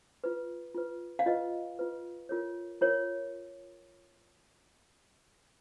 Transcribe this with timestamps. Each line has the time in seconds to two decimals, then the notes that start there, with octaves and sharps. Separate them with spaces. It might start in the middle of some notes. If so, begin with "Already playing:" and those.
0.24 F4 B4
0.75 F4 B4
1.19 F5
1.26 F4 B4 D#5
1.79 F4 B4
2.29 F4 A#4 C#5
2.81 F4 A#4 C#5